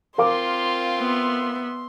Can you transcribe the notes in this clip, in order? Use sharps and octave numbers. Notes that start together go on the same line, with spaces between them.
C4 F4 A#4 F5 C6 D6
B3 E5